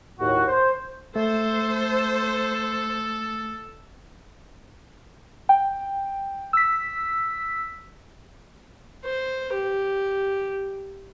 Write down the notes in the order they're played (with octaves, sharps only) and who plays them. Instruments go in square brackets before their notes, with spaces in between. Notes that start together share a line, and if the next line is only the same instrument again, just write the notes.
[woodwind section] D#2 A2 F#4
C5
[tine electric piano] A3 [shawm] A4 [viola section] C5
[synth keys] G5
E6 B6
[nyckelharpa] C5
G4